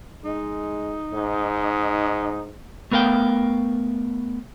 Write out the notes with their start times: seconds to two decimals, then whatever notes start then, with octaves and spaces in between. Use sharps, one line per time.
0.25 G#3 D#4
1.13 G#2
2.91 A3 B3 A#4 F5 G5